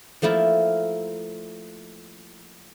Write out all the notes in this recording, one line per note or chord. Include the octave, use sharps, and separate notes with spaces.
F3 A3 A#3 E4 A#4